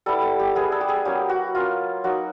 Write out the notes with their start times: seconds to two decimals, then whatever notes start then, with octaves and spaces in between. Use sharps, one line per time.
0.06 G3 B3 E4 A4
0.22 A4
0.39 G4
0.55 G3 B3 E4 G#4
0.72 A4
0.81 G4
0.88 G#4
1.05 F#3 A#3 C#4 G4
1.29 F#4
1.55 F#3 A#3 C#4 F4
2.04 F#3 A#3 D#4 F#4